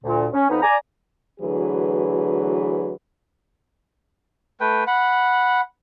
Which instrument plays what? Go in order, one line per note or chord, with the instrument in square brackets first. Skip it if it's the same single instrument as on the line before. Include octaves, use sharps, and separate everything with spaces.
[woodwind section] D2 A#2
C#4
F2 B3 D#4
D5 G#5 A#5
[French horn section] D2 E3 F#3 G#4 B4
[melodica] A3 B4 G5
F#5 B5